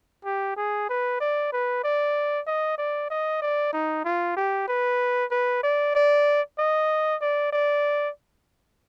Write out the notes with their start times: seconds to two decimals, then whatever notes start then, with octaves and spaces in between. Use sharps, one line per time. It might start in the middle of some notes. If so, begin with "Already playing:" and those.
0.25 G4
0.57 G#4
0.89 B4
1.20 D5
1.53 B4
1.84 D5
2.47 D#5
2.78 D5
3.10 D#5
3.42 D5
3.73 D#4
4.05 F4
4.37 G4
4.68 B4
5.31 B4
5.63 D5
5.95 D5
6.59 D#5
7.21 D5
7.53 D5